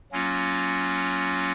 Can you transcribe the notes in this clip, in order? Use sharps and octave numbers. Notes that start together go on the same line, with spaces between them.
F#3 A#3 C#4 F4